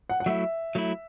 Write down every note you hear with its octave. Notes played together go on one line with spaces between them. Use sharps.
F#5
F#5
F#3 A3 E4 E5
F#3 A3 E4